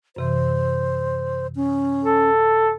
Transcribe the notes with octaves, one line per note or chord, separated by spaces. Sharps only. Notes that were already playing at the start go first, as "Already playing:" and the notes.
F#2 C3 E3 C5
C#4
A4